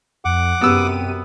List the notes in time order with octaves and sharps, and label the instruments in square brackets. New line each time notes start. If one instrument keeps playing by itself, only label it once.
[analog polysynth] F2 [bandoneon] F#5 D6
[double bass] F#2 [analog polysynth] C3 G4 D#7 [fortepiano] B3 E6